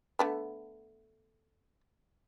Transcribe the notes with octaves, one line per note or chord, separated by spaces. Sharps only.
D3 A3 B3